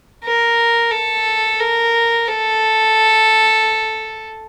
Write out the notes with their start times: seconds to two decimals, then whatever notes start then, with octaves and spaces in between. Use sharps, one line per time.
0.24 A#4
0.91 A4
1.60 A#4
2.28 A4